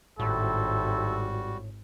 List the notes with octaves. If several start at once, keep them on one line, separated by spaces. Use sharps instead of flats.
G#1 A2 G3 C4 E4 F#4 A4